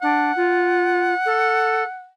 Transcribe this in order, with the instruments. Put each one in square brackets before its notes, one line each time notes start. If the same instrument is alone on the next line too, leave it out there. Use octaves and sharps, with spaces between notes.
[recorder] D4 [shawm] F#5
[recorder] F4
A4